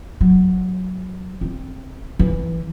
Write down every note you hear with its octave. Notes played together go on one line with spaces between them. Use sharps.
F#3
C4
E3